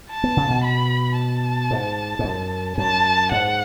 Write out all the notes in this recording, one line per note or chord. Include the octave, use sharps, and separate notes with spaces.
A5
B3
C#3
B2
B5
A5
G#2
G#2
F#2
F#2 A5
G#2 F#5